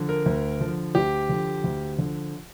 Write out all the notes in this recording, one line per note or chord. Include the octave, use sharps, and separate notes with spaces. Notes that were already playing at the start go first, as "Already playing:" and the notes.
Already playing: D3 F3
A#4
D2
D3 F3
D2 G4
D3 F3
D2
D3 F3